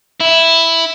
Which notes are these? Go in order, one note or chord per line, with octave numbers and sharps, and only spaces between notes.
E4